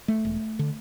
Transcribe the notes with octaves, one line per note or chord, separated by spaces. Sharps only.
A3
E1
D3